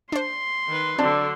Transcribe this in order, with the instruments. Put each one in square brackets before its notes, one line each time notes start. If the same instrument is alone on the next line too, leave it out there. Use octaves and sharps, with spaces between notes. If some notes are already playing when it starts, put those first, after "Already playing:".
[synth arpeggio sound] D4 C5 [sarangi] C6
[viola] D#3 B4
[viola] D3 F#3 [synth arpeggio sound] C4 [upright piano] D4 A5